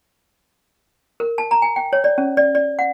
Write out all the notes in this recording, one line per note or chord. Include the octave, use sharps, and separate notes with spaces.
A#4
A5
A#5
G#5
G5
C#5
D5
C#4
D5
D5
F#5